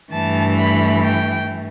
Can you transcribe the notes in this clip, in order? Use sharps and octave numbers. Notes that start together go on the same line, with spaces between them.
G2 E3 A3 A5
B5
G5